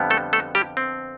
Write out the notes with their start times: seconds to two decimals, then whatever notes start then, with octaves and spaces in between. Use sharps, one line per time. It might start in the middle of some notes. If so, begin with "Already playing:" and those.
Already playing: F2 D3 G3 B3
0.10 A3 A4
0.33 A3 A4
0.55 G3 G4
0.77 C4